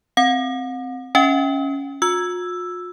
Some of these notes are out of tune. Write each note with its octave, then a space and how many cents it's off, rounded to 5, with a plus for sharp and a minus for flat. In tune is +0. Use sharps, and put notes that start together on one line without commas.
C4 -5 F#5 -45
C#4 +0 E5 -25 G5 +0
F4 +45 E6 +5